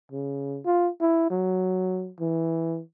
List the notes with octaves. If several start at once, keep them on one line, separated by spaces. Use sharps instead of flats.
C#3
F4
E4
F#3
E3